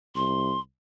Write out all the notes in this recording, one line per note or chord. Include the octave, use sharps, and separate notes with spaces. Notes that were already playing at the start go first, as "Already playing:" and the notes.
C2 C6